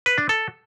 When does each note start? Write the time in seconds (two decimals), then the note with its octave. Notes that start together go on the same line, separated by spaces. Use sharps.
0.06 B4
0.18 D4
0.29 A4